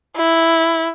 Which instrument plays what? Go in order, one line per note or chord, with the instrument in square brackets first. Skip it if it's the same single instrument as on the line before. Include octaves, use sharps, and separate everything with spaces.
[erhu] E4